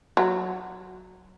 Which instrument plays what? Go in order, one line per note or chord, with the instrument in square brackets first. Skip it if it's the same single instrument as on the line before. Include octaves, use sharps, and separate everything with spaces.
[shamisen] F#3